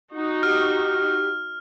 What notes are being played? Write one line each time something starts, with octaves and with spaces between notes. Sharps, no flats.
D#4 F#4
G4 F6